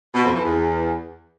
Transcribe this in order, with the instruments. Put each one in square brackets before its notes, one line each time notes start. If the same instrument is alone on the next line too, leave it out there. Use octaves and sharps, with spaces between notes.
[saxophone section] B2
F2
E3
E2